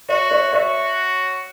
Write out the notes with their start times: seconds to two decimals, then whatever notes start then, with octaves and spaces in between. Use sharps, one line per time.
0.09 F#4 C#5 E5
0.31 C#5 E5
0.53 F#4 C#5 E5